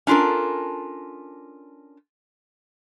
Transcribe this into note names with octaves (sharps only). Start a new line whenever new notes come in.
C#4 D4 F4 A4 A#4